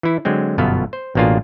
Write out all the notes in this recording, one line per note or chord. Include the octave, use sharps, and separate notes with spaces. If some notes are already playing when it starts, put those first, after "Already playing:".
E3 E4
D3 F#3 G#3 C4
G1 F#2 B2 B3 A4 F5
C5
A1 B2 A#3 D4 F4 G#4